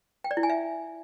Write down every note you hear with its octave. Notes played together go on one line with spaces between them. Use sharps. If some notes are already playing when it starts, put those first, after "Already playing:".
G5
D5
E4
G#5
E5